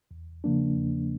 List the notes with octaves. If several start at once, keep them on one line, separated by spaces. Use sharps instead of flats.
E2
C#3 F3 A#3 D4
E2